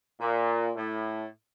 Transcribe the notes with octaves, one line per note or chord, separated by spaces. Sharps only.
A#2
A2